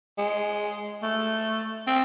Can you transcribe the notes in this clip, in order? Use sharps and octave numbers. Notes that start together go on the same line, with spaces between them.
G#3
A3
C4